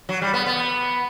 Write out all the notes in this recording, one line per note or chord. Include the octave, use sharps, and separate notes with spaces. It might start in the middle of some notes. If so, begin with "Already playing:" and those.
F#3
G3
B3
B3